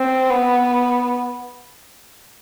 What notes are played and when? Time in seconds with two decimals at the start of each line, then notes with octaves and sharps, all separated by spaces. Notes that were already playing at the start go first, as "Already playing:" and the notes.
Already playing: C4
0.30 B3